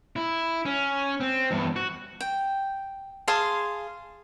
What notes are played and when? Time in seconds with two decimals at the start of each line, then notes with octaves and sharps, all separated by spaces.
0.16 E4
0.65 C#4
1.20 C4
1.51 E2 G2
1.76 F#4
2.20 G5
3.28 G#4 F5 A5 C6